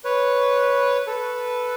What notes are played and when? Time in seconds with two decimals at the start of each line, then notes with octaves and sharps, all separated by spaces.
0.04 B4 C#5
1.07 A4 B4